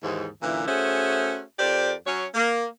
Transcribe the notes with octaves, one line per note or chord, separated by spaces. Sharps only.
D#2 G#2 E3
F#2 A#2 D3 E3
A3 C#4 F#4 G#4 C5 E5
F2 G4 A#4 C5 D5
F#3 C#4 C#5
A#3